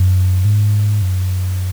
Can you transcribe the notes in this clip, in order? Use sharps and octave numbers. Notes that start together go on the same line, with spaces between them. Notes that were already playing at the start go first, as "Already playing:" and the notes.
Already playing: F#2
G#2
F#2